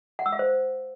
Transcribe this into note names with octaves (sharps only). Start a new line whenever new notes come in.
F#5
E6
F5
C5